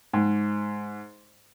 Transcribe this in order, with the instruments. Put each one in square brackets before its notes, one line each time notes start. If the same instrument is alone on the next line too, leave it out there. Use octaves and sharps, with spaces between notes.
[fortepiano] G#2